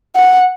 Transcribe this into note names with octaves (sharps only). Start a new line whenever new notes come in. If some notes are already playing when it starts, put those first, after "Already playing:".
F#5